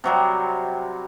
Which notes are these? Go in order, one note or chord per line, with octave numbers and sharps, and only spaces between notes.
C3 F#3 G3